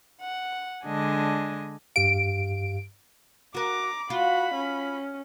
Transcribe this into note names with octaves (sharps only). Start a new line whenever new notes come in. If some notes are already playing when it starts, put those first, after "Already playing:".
F#5
D3 G#3 D4 D#5 G#5
G2 G4 F5 D7
F#4 A#4 A#5 D6
F4 F#4 B5
C#4